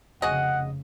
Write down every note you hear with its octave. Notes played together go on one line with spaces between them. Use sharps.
F1 C#3 F#4 G#4 D#5 F#5